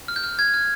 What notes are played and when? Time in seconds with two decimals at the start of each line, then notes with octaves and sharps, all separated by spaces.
0.08 F6
0.16 G6
0.24 F6
0.39 F6 G#6
0.54 F6